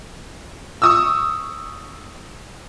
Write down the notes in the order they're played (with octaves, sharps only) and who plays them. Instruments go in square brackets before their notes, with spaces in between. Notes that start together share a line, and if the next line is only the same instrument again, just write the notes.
[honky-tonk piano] C#6 D#6 E6